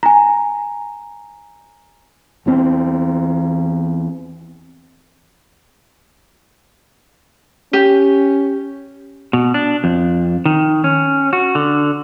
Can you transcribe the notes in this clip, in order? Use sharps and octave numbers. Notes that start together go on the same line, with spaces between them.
G#5 A#5
E2 E3 C4
C#4 G4
B2
D4
F2
D#3
C#4
F#4
D3